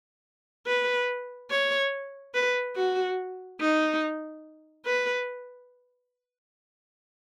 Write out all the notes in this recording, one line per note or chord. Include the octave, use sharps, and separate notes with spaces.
B4
C#5
B4
F#4
D#4
B4